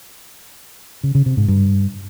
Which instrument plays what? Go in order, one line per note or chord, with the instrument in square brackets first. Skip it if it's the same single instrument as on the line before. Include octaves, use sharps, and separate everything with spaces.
[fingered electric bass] C#3
C#3
C3
G#2
G2